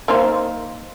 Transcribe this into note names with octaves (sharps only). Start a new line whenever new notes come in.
A#3 D#4 C5